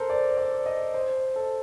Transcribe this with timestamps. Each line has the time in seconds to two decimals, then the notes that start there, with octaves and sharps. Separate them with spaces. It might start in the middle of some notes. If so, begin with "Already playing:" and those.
Already playing: A4 A#4 C5
0.10 D5
0.37 D5
0.66 D#5
0.94 C5
1.36 A4